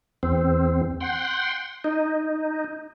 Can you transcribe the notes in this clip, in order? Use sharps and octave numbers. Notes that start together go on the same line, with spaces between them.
E2 C4
F#5 G5 C6
D#4